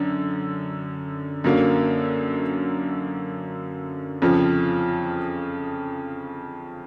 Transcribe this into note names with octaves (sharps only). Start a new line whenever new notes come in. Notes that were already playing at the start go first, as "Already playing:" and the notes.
Already playing: F#2 D3
F#2 D3 F#3 A#3
F2 C#3 F3